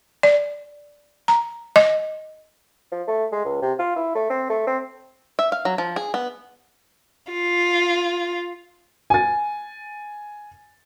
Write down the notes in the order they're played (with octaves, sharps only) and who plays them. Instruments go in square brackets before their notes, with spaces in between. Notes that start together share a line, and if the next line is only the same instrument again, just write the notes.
[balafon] D5
A#5
D#5
[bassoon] F3
A3
G#3
C#2
C3
F4
E4
A3
C4
A3
C4
[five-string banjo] E5
F5
F#3
F3
G#4
B3
[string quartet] F4
[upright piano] G#5 A6